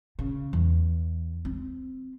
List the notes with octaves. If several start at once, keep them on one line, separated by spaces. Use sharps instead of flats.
C#3
E2
C4